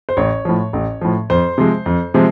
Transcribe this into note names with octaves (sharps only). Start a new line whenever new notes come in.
C5
A1 C#5
A2 F3
A1
A2 F3
F2 C5
C3 F3 G#3
F2
C3 F3 G#3